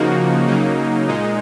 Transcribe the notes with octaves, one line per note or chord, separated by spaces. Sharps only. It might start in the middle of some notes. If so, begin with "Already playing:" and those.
Already playing: C#3 F3 A#3 D#4 F#4
C#3 F#3 A#3 D#4
A#2 G#3 D#4